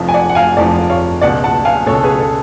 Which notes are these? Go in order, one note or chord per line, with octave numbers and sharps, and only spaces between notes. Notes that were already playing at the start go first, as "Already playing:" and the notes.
Already playing: F1 F2 F3
G#5
D5 F#5
F#5
F5 G#5
F1 F2 F3 D5 F#5
C#5 F5
C#2 B2 D5 F#5
F#5 A5
F5 G#5
C#2 B2 A4 C#5
G#4 B4
A4